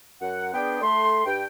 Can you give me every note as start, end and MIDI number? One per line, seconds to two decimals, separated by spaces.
0.21 0.51 42
0.21 0.51 78
0.54 0.78 59
0.54 0.78 62
0.54 0.78 68
0.54 0.78 79
0.82 1.24 57
0.82 1.24 84
1.25 1.45 43
1.25 1.45 79